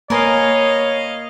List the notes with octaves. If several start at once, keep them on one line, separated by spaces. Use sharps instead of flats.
A#3 A#4 B4 C#5 D#5 F5 G#5